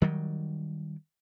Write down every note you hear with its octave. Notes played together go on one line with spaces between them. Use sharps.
D#3 F#3 G3